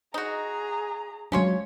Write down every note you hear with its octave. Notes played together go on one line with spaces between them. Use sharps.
D#4 F#4 G#4 A#5
F#3 G#3 C#4 D4 F4 C#5